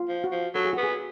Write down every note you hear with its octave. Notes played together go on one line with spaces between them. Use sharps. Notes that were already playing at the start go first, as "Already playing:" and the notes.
Already playing: F4
F3
F#4
F3
F#3 A4
G#4
F#4
B3
G#4